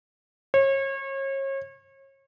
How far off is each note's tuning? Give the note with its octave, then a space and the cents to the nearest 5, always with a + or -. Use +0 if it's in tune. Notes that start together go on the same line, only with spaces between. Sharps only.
C#5 -35